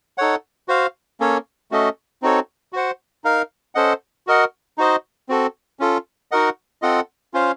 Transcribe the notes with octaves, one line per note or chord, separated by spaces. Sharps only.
D#4 A4 C#5 F#5
F#4 C5 F5
A#3 C#4 A4 C#5
A3 C#4 F#4 A4 D#5
C4 D#4 F#4 A4 C#5
F#4 C5 F#5
D#4 A#4 F5
C#4 A4 C5 D#5 F#5
F#4 A#4 D#5 F#5
D#4 F#4 C5 D#5
C4 F#4 A4
C#4 F4 A4
D#4 F#4 A#4 D#5 F#5
C4 F4 A4 D#5 F#5
C#4 F4 C5 F5